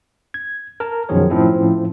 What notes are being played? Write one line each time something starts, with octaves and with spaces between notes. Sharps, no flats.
G#6
A#4 A5
F#2 B2 D#3 F3 G#4 C#5
A2 F3 C4 C#4 E4